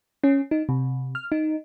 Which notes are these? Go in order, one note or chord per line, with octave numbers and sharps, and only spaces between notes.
C#4
D#4
C3
F6
D#4